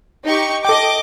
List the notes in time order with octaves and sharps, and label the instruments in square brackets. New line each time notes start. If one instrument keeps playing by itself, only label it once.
[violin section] D#4 G4 C#6
[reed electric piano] A4 G5 [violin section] D#5 D6